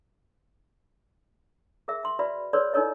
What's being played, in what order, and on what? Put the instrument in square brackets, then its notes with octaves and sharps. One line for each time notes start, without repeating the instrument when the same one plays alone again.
[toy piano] G#4 A#4 E5
E5 C6
F#4 B4 D5 E5 B5
G#4 A#4 B4 C#5 D5 C6
D#4 E4 A4 A#4 C#5 D#5